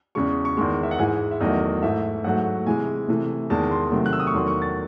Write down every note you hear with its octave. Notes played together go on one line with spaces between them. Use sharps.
E2 C#3 G#3 C#6
C#6
E2 D#3 G#3 C6
E5
F#5
G#2 E3 G#3 G#5
E5
E2 D#3 F#3 A3 D#5
G#2 E3 A3 E5
G#2 F#3 A3 F#5
C3 E3 G#3 G#5
C3 E3 A3
E2 D#3 G#3 A5
C6
C3 D#3 F#3 A3
F#6
E6
D#6
C#6
E2 D#3 F#3 A3 C6
C#6
A6